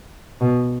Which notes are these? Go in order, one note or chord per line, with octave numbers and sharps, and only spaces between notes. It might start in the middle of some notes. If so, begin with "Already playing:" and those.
B2